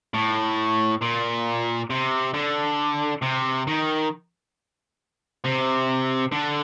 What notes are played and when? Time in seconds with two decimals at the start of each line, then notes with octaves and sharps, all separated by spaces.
0.14 A2
1.02 A#2
1.90 C3
2.34 D3
3.22 C3
3.67 D#3
5.44 C3
6.32 D3